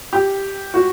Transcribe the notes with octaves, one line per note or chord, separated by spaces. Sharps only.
G4
F#4